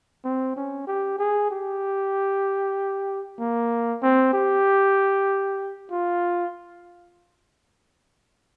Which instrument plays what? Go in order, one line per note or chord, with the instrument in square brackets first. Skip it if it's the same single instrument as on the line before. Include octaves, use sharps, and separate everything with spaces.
[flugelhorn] C4
C#4
G4
G#4
G4
A#3
C4
G4
F4